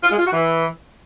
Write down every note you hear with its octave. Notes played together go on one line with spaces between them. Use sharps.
F4
G#3
F4
F#4
E3